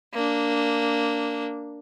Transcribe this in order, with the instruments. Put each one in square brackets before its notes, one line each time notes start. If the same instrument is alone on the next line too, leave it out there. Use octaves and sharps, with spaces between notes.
[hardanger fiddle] A#3 D4